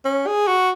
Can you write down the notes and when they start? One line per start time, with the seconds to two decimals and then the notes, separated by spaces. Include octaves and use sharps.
0.05 C#4
0.27 G#4
0.48 F#4